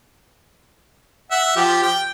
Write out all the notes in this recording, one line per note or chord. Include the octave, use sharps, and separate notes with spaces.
E5 F#5
F3 G4
G5